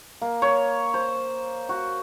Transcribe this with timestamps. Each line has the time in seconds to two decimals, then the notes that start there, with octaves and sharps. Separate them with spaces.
0.22 A#3
0.42 C#5
0.94 C5
1.69 F#4